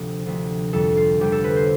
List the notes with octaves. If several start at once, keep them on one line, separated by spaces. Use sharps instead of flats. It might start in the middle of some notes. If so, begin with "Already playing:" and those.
Already playing: D2 C3 F3
D2 C3 F3
F2 D3 G3 A4
F4
F2 D3 G3 G4
A4
B4
C5